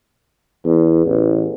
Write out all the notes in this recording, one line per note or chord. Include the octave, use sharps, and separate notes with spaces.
E2
A1